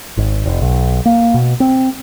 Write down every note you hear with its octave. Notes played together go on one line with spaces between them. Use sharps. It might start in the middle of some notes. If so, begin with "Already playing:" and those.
G#1
F1
B1
A#3
B2
C4